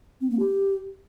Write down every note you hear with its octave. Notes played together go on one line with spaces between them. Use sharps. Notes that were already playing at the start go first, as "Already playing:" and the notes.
C4
A#3
G4